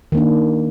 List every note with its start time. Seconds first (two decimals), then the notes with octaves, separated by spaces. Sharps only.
0.12 D#3
0.15 A#3
0.17 D4